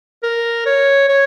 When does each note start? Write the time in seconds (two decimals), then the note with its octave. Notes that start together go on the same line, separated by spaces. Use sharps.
0.23 A#4
0.66 C#5
1.09 C#5